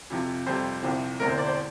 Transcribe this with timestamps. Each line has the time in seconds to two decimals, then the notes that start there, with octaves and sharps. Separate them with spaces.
0.10 F2 C3 F3
0.46 F2 C3 G3 C4 C5
0.83 C2 C3 F3 C4
1.20 E1 E2 D3 A3 C4 A#4
1.29 C5
1.38 D5
1.47 C5